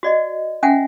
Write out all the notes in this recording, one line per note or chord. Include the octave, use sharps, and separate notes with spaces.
F#4 D5 D#5
C#4 E5 F#5 G#5